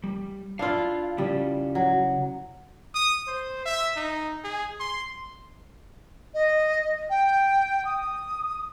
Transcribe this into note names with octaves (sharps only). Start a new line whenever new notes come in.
G3
D4 E4 F4 F5
C#3 G3 C#4 E4
F#3
D#6
C5
E5
D#4
G#4
C6
D#5
G5
D#6